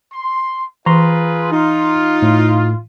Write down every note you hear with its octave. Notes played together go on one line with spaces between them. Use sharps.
C6
E3 F4 G#4 B4 A#5 C6
D#4 F4
A2